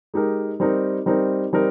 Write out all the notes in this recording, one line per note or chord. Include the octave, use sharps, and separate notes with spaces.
G#3 D#4 G4 A#4
G3 C4 D#4 A#4
G3 C4 D#4 A#4
G3 C4 D#4 A#4